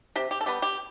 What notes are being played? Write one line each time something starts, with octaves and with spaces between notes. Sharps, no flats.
C3 G4
G4
A4
G3 B3 G4
G4